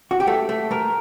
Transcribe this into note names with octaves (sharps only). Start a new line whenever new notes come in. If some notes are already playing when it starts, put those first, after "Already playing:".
F#4
G4
A3 A4
A3
A3 A#4